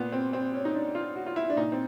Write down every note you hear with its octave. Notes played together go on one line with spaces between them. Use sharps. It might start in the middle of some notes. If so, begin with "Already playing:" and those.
Already playing: A#2 B3
C4
C4
C#4
D#4
D4
F4
F#4
F4
E4
D4
A#2 D#4
C4